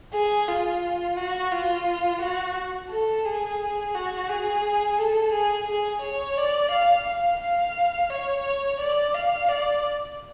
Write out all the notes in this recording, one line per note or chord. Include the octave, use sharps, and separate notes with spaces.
G#4
F4
F#4
F4
F#4
A4
G#4
F#4
G#4
A4
G#4
G#4
C#5
D5
F5
F5
F5
C#5
D5
F5
D5